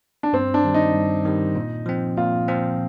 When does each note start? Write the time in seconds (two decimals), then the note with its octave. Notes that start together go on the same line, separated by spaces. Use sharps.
0.23 D4
0.33 G2 C4
0.54 D4
0.64 D#3 G3
0.74 D#4
0.94 G2
1.25 D#3 G3
1.55 A#2
1.86 F3 C4
2.17 A#2 F4
2.48 F3 C4